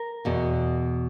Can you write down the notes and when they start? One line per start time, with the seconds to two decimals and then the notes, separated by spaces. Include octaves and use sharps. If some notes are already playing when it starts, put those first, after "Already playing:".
Already playing: A#4
0.25 E2 B2